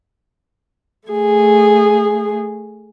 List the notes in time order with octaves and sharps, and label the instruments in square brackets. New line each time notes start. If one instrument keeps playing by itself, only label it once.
[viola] A3 G#4